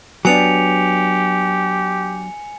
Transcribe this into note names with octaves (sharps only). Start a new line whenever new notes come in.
F#3 B3 D4 G4 G#5 C#7 F7